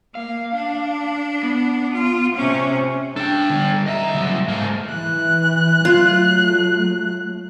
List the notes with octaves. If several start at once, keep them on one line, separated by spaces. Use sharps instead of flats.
A#3 F5
D4
B3
F4
C3 C#4
D4 A4 G5
D3 G3
C2 D#5 E5 A#5
C#3 F#3
G#2 A3 A#3
E3 F#6
F#3 A3 F4